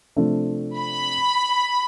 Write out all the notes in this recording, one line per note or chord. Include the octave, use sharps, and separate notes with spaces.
C3 F3 A3 D4
B5